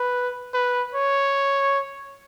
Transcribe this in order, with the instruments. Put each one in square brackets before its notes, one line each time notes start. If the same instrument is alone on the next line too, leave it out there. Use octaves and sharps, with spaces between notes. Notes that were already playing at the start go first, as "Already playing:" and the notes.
Already playing: [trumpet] B4
B4
C#5